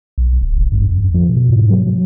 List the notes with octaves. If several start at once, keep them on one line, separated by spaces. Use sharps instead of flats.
B1
D1
G#1
G2
F2
F3
B2
G#2
F#3
F#3